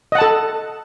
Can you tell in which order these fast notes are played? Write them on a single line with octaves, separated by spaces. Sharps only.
D#5 F#5 A5 A4